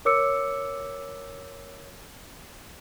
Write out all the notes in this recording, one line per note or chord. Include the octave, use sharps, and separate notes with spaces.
A#4 C#5 D6 E6 C#7